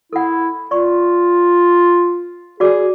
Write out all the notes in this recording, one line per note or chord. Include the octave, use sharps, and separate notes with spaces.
E4 A4 F#5
F4 D5 C#6
F#4 G#4 D5 D6